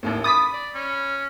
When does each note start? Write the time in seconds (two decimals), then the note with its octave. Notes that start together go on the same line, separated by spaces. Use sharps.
0.03 A1 D#2 A2
0.24 B5 D6 D#6 A6 B6
0.53 D5
0.75 C#4